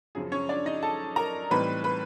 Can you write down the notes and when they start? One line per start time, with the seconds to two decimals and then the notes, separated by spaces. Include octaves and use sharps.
0.15 F#2 C#3 F3 G#4
0.32 C#4 C#5
0.49 D4 D5
0.66 D#4 D#5
0.82 A4 A5
1.16 A#4 A#5
1.51 A2 E3 G3 C4 D#4 B4 B5
1.84 B4 B5